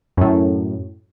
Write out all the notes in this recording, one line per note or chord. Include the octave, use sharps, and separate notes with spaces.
F#2 A2